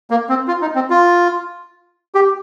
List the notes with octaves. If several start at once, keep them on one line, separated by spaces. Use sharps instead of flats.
A#3
C4
F4
D#4
C4
F4
G4